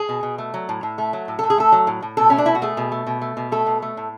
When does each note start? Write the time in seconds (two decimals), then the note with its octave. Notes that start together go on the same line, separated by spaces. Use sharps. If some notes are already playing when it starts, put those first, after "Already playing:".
Already playing: G#4
0.09 B2
0.23 B2
0.38 A3
0.54 F#3
0.69 A2
0.83 A2
0.98 A3
1.13 F#3
1.28 A2
1.39 A2 A4
1.50 G#4
1.58 A3 A4
1.72 F#3
1.87 A2
2.02 A2
2.17 B2 A4
2.30 A3 C#4
2.38 D4
2.46 B2 E4
2.55 F#4
2.62 A3 G#4
2.77 B2
2.92 A3
3.07 B2
3.22 A3
3.37 B2
3.52 A3 A4
3.66 B2
3.82 A3
3.97 A2